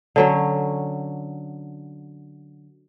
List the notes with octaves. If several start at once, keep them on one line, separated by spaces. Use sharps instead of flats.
D3 F#3 C#4